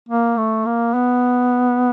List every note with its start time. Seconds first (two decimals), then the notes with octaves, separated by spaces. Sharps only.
0.09 A#3
0.37 A3
0.66 A#3
0.94 B3